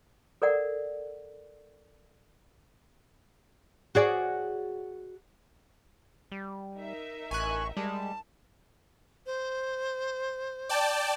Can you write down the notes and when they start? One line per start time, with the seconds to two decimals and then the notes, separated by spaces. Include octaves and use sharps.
0.42 A4 A#4 D5 F#5
3.95 F#4 G#4 D5
6.32 G3
6.77 D#4 A#4 E5
7.31 A1 G#5 C#6 F#6
7.77 G3 G#3 A5
9.26 C5
10.69 D5 G5 A5